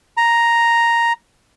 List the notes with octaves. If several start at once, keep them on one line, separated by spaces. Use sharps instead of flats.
A#5